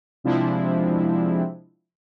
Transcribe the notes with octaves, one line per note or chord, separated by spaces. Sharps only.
C3 F3 G#3 C4 D4 E4